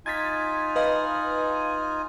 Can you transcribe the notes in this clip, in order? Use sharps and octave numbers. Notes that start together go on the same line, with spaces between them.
D#4 F4 G#5 G#6 A6 B6
B4 D#5 F5